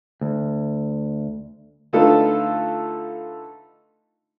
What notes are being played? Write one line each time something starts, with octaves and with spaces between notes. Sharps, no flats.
D2
D3 A3 D#4 F4 A4 B4